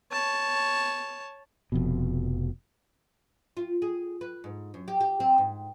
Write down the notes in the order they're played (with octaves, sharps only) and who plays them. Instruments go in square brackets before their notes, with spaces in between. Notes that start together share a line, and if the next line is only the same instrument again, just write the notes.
[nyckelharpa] C#5 A5
[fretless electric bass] F1 F2 B2
[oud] F4
G#4
B4
G#2
F#2
G4
G4
C4
G#2